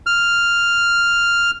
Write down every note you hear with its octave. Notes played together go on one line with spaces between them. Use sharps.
F6